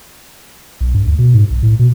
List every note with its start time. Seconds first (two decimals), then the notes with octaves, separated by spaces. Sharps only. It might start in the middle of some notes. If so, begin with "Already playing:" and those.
0.81 B1
0.94 G2
1.06 D2
1.19 B2
1.34 G#2
1.50 B1
1.63 A2
1.79 B2